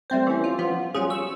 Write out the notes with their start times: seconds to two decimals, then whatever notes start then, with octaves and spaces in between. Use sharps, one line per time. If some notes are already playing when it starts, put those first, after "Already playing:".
0.10 G3 A3 C4 C5
0.27 E3 C#4
0.44 F4
0.59 F3 B3 F4
0.94 F#3 G3 C#4 F4 G#4
1.10 C#6 E6